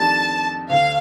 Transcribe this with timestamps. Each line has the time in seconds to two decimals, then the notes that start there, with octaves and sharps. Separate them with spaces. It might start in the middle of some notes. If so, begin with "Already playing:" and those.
Already playing: F2 D#3 A3 D4 G4 A5
0.70 D2 D3 A3 F5